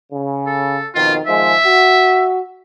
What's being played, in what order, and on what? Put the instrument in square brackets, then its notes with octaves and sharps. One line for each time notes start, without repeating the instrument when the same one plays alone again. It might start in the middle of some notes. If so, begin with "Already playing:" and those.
[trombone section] C#3
[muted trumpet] A4
[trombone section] F2 B2 D#3 [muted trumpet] F4
[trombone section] D#3 F3 G#3 [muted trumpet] E5
[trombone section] F#4